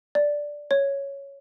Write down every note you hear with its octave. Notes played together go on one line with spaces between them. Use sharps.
D5
C#5